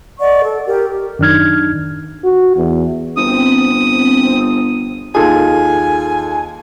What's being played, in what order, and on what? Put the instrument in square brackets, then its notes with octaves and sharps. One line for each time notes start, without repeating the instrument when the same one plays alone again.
[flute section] D5 D#5 F#5 C#6
A4
G4 A#4
[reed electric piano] F#2 D#3 D4 D#4 F6 G#6
[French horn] F#4
E2
[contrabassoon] G1 [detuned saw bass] C4 [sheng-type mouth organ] D#6
[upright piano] D#2 F4 [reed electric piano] G#4 A4 [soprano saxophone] G#5